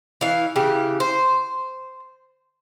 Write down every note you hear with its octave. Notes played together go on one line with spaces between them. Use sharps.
E3 F5
C#3 E3 G4
C5